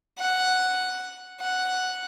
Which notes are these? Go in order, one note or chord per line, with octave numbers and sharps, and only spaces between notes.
F#5
F#5